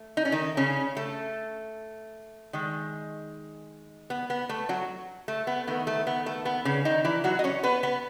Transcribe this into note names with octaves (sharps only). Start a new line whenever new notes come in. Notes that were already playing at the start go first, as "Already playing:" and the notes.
Already playing: A3
D#4
C#4
D#3 D#4
C#3 C#4
A3
D#3 G#3
B3
B3
A3
F#3 F#4
A3
B3
D#3 A3 B3
A3
B3
A3
B3
C#3 C#4
D#3 D#4
E3 E4
F#3 F#4
D#5
C#4 C#5
B3 B4
B3 B4